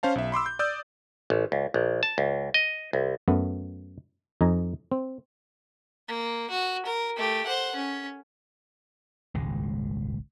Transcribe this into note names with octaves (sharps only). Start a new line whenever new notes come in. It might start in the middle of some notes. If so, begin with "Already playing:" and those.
C#4 C5 F5 A5
B1 E5
B5 C6 D6 E6
G6
D5 D#6 E6 G6
A1
C#2
A#1
A5
C#2
D#5
C2
F#2 A3 B3
F2 D#4 G#5 A#5
C4
A#3
F#4
A#4
A3 G4
C5 F#5
C#4
D#1 G#1 C#2 G#3